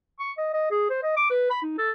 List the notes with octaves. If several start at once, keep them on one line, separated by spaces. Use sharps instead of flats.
C#6
D#5
D#5
G#4
C5
D#5
D6
B4
B5
D#4
A4